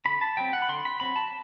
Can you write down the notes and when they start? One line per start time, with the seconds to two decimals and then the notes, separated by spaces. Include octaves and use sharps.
0.05 D3 B5
0.21 A5
0.37 F#3 C4 G5
0.53 F#5
0.62 B5
0.69 D3 C6
0.85 B5
1.00 F#3 C4 B5
1.16 A5